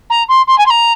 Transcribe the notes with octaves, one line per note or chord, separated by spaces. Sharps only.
A#5
C6
C6
G#5
C6
A#5